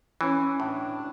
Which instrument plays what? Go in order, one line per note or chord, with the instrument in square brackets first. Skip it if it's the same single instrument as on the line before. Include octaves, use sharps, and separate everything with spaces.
[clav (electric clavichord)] E3 [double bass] C#4
[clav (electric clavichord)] A2 [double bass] D4